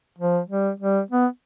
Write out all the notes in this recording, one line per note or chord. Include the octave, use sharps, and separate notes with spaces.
F3
G3
G3
B3